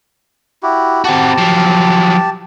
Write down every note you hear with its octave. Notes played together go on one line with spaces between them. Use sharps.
E4 F#4 G4
C4 F#4 G4 A5
F3 F#3